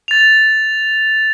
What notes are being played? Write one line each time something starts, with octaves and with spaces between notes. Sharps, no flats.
A6 F7